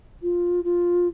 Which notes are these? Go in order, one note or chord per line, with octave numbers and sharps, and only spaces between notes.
F4
F4